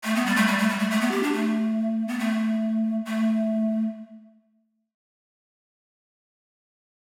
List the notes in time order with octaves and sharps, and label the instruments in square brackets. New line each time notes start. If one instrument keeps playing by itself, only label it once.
[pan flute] A3
B3
G3
A3
G3
A3
G3
A3
A3
B3
G4
D4
A3
B3
A3
A3